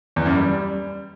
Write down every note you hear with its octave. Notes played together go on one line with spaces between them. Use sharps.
E2
F#2
G3